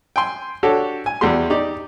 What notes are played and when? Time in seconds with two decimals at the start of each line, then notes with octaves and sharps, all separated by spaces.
0.16 G5 G#5 C6
0.63 D4 F#4 G4 A4 C#5
1.06 G#5
1.21 E2 G3 F#4 G4 C6
1.50 D#4 G4 D5